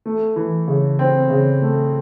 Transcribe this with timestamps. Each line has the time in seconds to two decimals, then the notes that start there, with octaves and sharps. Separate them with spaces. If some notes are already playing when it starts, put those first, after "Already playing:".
0.06 A3
0.36 E3
0.68 C#3
0.99 C4
1.30 C#3
1.62 A3